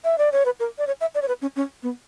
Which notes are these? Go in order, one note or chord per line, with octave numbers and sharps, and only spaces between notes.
E5
D5
C#5
B4
A#4
D5
C#5
E5
D5
C#5
B4
C#4
C#4
B3